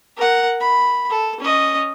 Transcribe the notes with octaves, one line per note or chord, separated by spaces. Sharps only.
A#4 F#5
B5
A4
C#4 D#5